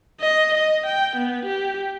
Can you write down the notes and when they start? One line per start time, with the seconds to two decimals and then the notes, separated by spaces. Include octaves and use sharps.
0.20 D#5
0.54 D#5
0.86 G5
1.16 B3
1.45 G4